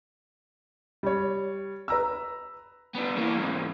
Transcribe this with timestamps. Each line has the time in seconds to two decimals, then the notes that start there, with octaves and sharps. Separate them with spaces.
1.03 G3 C#5
1.88 B4 A#5 E6
2.95 B3 D4
3.17 E3 A#3
3.35 E2 G#2